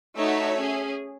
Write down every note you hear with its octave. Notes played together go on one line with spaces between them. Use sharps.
A3 D#4 F#4 C#5 E5
C#4 G#4